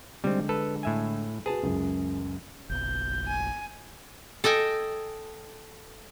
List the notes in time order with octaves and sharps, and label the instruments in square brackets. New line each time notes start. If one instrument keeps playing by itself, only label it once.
[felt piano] D3 G#3 [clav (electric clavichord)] G3 C4
[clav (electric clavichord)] A4 B4
A2 E5 G#5
[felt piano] F#4 B4 [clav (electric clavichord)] G#4 A5
[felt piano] C#2 F#2
[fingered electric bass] F#1 B1 [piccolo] G6
[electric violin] G#5
[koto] A4 D#5 G5 G#5